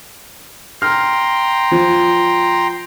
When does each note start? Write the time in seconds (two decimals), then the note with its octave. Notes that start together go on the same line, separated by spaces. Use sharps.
0.82 G5 A#5 C6 F6
1.71 F3